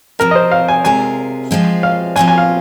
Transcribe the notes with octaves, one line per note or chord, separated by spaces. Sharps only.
C3 F3 C4 A#4
D#5
C5
F5
G#5
C3 G#3 F4 A#4 G#5
F3 G#3 C4 F4
F5
A#2 F3 C4 F4 G#5
G#5
F5